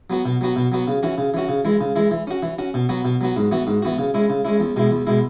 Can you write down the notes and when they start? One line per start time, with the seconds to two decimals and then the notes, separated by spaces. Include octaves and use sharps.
0.10 F#3 B3 F#4
0.25 B2
0.41 F#3 B3 F#4
0.56 B2
0.72 F#3 B3 F#4
0.88 C#3
1.03 E3 C#4 F#4
1.18 C#3
1.34 E3 C#4 F#4
1.49 C#3
1.65 E3 G#3 E4
1.81 C#3
1.96 E3 G#3 E4
2.11 E3
2.27 C#4 F#4
2.43 E3
2.59 C#4 F#4
2.74 B2
2.89 F#3 B3 F#4
3.05 B2
3.21 F#3 B3 F#4
3.36 G#2
3.51 E3 B3 F#4
3.67 G#2
3.82 E3 B3 F#4
3.99 C#3
4.14 G#3 C#4 E4
4.30 C#3
4.45 G#3 C#4 E4
4.60 E2
4.76 B2 G#3 E4
4.91 E2
5.07 B2 G#3 E4